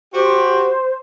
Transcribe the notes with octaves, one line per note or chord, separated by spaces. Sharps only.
F#4 G4 C5